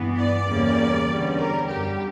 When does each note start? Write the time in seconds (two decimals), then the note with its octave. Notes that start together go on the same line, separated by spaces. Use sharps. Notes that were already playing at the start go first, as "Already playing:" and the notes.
Already playing: G2 E3 B3
0.17 D5
0.47 E2 C#3 G3 A#3
1.08 E2 D3 G3 C#4
1.38 A#4
1.68 F#2 D3 G3 G4